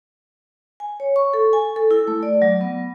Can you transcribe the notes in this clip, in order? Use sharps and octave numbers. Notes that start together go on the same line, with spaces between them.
G#5
C#5
C#6
A4
G#5
A4
E4
A3
D5
F#3
B3